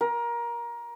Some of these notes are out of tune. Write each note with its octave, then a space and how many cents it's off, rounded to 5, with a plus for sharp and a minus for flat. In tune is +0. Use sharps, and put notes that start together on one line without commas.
A#4 +20